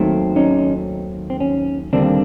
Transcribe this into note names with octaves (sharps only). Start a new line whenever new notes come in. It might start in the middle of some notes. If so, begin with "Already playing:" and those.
Already playing: D#2 D#3 F#3 A3 C4
C#4 D#4
C4
C#4
D#2 D3 G3 A#3 C4 D4